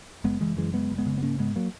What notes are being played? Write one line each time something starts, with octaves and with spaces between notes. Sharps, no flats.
F#1 G#3 B3
F#1 E3 G#3
F#2 E3 G#3
F#1 G#3 B3
F#1
G#3 B3
C#3
B3
G#2 A#3 C#4
G#2 G#3 B3
F#3 A#3